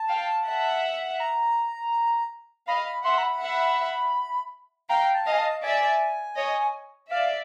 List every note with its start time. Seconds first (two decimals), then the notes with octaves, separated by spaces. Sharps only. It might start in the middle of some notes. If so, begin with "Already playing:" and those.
Already playing: A5
0.08 F5 G5
0.46 E5 F#5
1.20 A#5
2.68 D#5 F5 B5
2.86 B5
3.04 E5 F#5 C6
3.18 A#5
3.23 B5
3.42 E5 F#5
4.89 F5 G5 A#5
5.14 A5
5.26 D#5 F5
5.32 G#5
5.38 A5
5.63 D5 E5 G#5
6.37 C#5 D#5
7.11 D5 E5 F5